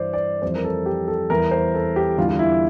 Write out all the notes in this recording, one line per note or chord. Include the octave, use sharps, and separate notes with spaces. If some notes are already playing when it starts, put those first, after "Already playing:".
Already playing: G2 E3 G3 C5 D5
D5
F2 E3 G3 C5
A#4
A4
G4
A4
E2 E3 G3 A#4
C5
A4
G4
E2 D3 G3 F4
F4
E4